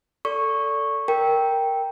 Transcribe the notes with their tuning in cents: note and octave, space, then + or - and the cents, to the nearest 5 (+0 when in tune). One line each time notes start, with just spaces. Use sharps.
A4 +15 D5 -25 C#6 -10
A#4 +0 G5 +0